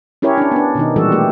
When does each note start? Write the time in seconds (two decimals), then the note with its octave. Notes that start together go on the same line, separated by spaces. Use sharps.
0.22 C#4 E4 G4 A#4 C#5
0.38 C#4 D4
0.52 B3 D4
0.75 B2 D#3 D#4
0.96 A#2 E3 G3 G#3 F#4 A4
1.12 A3 G4